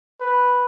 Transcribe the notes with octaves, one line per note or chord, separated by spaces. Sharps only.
B4